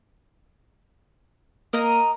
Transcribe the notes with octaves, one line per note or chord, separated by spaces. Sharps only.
A#3 D#5 A#5